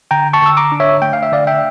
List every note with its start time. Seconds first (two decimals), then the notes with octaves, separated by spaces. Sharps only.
0.11 D3 G5 A#5
0.33 A5 C#6
0.42 D3 E6
0.57 A#5 D6
0.72 D4
0.80 C#5 E5
1.02 A3 G5
1.13 F5
1.23 E5
1.32 D3 D5 F5
1.47 E5 G5